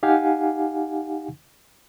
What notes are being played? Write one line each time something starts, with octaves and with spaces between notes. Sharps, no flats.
D#4 G4 F5 F#5 G#5